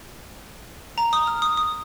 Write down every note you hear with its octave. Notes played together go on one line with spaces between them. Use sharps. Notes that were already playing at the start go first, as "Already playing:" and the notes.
A#5
D#6
F6
D#6
D#6